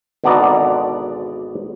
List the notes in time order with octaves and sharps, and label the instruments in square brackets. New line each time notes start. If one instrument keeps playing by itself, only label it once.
[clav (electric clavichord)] G#1 B2 D3 B3 D5 A#5